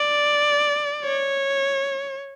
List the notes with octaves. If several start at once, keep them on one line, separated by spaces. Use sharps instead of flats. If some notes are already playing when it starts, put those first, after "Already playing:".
Already playing: D5
C#5